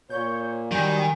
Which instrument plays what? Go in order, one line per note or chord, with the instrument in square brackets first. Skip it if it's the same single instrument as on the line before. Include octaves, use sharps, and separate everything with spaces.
[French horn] A#2 [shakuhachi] C#5 [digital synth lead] G6
[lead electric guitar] D#3 [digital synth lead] F#3 [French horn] G3 [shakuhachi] G#5